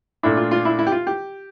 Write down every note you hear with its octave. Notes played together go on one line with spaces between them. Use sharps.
A#2 A3 D4 E4
F4
F4
E4
E4
G4
F4
G4